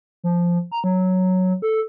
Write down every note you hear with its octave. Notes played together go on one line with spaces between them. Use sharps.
F3
A#5
F#3
A4